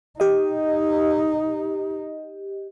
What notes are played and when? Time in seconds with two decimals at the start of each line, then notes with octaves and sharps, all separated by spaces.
0.20 D#4 G4 D#5